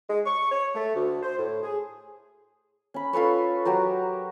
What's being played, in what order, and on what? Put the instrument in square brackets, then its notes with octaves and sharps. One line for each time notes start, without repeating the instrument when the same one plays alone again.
[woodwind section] G#3
C#6
C#5
A3
D2
C5
A2
G#4
[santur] C#4 B5
F4 A4 B4 C#5
F#3 F#4 G4 A#4